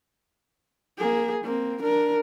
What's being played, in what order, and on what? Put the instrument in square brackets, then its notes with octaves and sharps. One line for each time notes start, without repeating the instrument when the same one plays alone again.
[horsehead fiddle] A#3 G#4
A#3 C4
D4 A#4